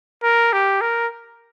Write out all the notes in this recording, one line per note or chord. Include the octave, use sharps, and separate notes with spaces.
A#4
G4
A#4